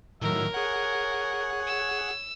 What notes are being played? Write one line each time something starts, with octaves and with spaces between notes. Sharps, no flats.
A2 D#3 F#3 A#4 E5
G#4 C#5 F#5
E6